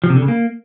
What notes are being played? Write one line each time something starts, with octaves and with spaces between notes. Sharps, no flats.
F3
C3
D3
C#3
A#3